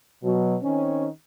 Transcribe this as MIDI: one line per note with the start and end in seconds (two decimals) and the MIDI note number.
0.24 0.56 47
0.24 0.56 54
0.63 1.06 51
0.63 1.06 60
0.63 1.06 61